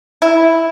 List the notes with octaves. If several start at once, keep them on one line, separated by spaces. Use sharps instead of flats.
E4